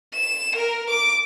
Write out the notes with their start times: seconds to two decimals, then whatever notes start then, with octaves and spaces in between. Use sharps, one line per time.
0.14 E7
0.56 A#4
0.90 D6